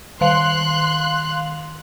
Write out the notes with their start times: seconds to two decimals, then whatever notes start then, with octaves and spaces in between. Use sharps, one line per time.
0.21 D#3 F5 C6 F#6 F7